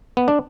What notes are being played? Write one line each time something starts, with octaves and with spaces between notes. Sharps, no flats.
B3
D4